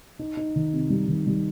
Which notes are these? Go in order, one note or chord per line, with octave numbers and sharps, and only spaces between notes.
D#4
D#4
D#3
C3
G3
D#3
G3